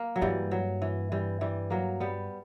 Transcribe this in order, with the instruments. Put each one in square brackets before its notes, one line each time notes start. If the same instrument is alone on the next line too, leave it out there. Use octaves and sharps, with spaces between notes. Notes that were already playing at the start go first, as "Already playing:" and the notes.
Already playing: [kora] A#3
F#3
[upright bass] G2 [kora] E3 G3
[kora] F#3
E3
E3 G3
E3 G3
F#3 A#3
G3 B3